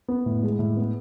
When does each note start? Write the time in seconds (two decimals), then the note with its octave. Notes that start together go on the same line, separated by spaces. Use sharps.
0.08 B3
0.26 A2
0.43 G#3
0.59 A2
0.77 B3